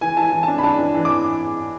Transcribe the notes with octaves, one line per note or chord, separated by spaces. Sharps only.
E3 G#5
E3 A5
G#5
E3
D4 A5
B5
D4 A5
E3
E3
D6